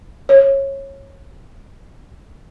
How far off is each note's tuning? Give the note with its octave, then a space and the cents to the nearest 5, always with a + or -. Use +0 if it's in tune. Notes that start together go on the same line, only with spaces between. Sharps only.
C#5 -20